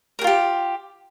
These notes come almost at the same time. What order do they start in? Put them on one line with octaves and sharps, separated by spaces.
A#4 G#4 F4 G4